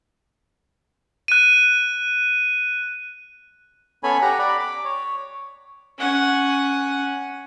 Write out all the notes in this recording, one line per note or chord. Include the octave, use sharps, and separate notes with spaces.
F#6 D#7
B3 C#4 A4 C#5 G#5 B5
G4 F#5 A#5
D5 B5
D6
C#5
C#4 F#5